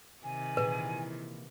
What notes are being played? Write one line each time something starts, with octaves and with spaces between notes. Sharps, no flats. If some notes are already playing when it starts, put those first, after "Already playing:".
C3 D#3 G#5
A#2 E3 G#4 B4